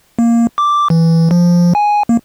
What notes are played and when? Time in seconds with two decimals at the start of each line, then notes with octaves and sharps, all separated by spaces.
0.19 A#3
0.58 D6
0.90 E3
1.31 F3
1.75 G#5
2.09 A#3